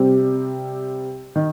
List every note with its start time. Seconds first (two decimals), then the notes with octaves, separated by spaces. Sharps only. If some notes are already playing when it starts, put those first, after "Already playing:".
Already playing: C3 G3 C4
1.36 D#3